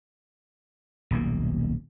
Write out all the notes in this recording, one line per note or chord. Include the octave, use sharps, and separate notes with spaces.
D#1 B1 A#3